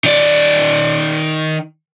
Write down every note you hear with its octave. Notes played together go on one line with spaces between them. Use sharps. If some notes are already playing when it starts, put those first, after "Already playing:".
D#3 D5